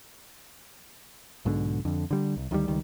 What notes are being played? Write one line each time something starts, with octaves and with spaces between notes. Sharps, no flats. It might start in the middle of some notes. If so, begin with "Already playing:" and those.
B1 G#2 B2 D3
F2 D3
D3 G3
C2
D2 D#3 E3 G3
C#2 D#3 G3